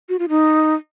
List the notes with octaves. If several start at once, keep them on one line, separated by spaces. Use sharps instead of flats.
F#4
F4
D#4